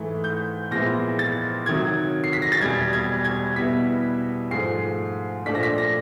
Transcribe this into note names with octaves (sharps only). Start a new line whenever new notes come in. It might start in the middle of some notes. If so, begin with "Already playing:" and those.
Already playing: G#2 E3 A3
G6
A#2 F3 G#3 B3 E4 A#6
A6
C3 D#3 F#3 G#6
C7
B6
A#6
A6
E2 B2 G3 G#6
G#6
G#6
B2 G3 B3 E4 B6
G#2 F3 A3 C7
A#2 F3 A3 D4 B6
A#6
B6
A#6